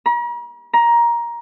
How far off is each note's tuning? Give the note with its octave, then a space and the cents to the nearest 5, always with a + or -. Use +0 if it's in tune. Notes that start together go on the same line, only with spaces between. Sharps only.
A#5 +45
A#5 +15